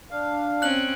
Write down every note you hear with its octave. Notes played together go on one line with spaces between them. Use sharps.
D4 F5
C4 C#4 F#6 F#7